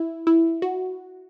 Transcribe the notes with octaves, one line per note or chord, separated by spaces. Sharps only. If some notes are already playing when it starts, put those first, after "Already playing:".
Already playing: E4
E4
F#4